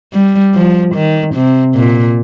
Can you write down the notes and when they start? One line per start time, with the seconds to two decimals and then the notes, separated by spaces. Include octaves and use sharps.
0.13 G3
0.54 F3
0.95 D#3
1.35 C3
1.76 A#2